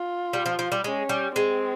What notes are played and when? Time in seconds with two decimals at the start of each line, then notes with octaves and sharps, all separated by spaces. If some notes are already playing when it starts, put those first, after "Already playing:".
Already playing: F4
0.33 G3
0.46 F3
0.59 F3
0.72 G3
0.84 G#3 C#4
1.09 G3
1.36 G#3 C4